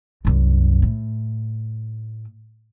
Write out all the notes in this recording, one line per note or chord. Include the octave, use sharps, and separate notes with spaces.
C2 F#2
A2